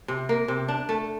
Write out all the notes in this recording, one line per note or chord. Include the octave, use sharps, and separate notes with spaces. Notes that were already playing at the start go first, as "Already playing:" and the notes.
C3
A#3
C3
D4
A3